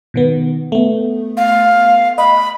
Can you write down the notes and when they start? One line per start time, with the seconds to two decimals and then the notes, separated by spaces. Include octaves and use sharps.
0.14 B2 D#3 B3
0.72 A3 B3
1.37 F5
2.18 D#5 B5